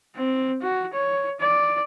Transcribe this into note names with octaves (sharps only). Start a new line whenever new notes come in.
C4
F#4
C#5
D5